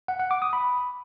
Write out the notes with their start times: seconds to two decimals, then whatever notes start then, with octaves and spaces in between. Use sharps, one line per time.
0.08 F#5
0.20 F#5
0.31 D6
0.42 D#6
0.53 B5